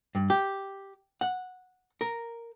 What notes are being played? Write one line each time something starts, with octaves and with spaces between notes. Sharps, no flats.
G2
G4
F#5
A#4